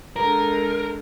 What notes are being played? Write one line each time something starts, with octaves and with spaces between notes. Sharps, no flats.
D3 G#3 A#4